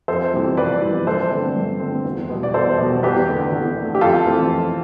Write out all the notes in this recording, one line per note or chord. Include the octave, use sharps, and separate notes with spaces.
F2 A4 C5
C3 E3 G3
F2 B4 D5
C3 E3 G3
G2 A4 C5
D3 A3 C4
G2
D3 A3 C4
E2
B2 G3 B3
D5
E2 A4 C5
B2 G3 B3
E2 G4 B4
D3 A3
E2
D3 A3
G4
F2 F4 A4
E3 A3 C4
F2